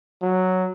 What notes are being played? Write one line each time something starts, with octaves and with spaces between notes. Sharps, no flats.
F#3